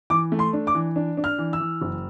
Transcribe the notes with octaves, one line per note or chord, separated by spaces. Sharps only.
E3 D6
A3
C6
D4
D6
E3
D4
D4
F6
E3
E6
E3
F#1